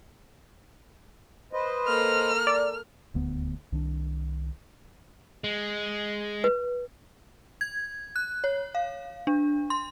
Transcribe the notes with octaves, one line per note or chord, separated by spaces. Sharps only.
B4 C5 D#5
A#3 A4 F6
D5
D#1 D2 B3
C2 D#3 D4
G#3
B4
G#6
F#6
C#5
F5
D4
C6